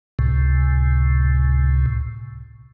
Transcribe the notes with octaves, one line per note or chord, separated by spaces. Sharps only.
C#2 A2 C3